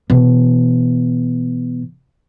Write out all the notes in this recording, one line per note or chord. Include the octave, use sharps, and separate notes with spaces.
B2 E3